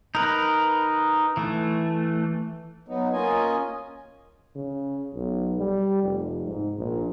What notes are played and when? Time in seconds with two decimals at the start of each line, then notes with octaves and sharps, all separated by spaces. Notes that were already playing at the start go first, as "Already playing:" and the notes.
0.15 D#4 A#4 B4
1.37 E3 A3
2.88 F#3 B3 D#4
3.13 A#3 C#4 F4 D#5 G#5
4.56 C#3
5.14 B1
5.59 G3
6.03 F1
6.46 G#2
6.78 A#1